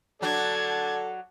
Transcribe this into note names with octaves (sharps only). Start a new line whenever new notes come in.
F#3 D4 F#4 A4 D5 A5 G#6